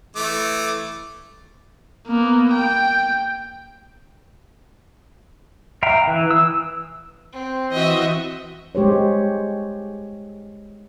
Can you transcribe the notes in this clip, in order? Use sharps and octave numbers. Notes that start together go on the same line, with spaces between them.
E3 A3 D6
A#3 B3
G5
E5 F5 G5 A#5
E3
E6
C4
E3 C4 F#4 D#5 E5
G#3 G4 C5 C#5